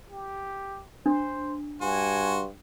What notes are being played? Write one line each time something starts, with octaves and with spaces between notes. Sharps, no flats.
G4
D4 C5
G2 F#4 G#5 C6